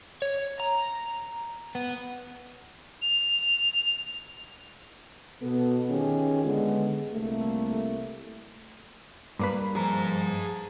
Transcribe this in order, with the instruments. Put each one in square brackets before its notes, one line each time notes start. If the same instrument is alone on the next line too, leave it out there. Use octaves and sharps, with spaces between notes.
[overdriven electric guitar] C#5
A#5
B3
[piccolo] F7
[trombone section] B2 B3 A4
D3 D#3 C#4 F4 G4 G#4
D3 G#3 B3
C2 A3 A#3
[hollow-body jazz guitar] G2 A#3 B4
[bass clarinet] F3 [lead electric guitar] G#4 A#5